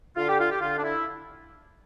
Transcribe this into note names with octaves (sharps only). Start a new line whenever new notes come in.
D3 F4
G4
F4
G4
D3 F4
D4
E4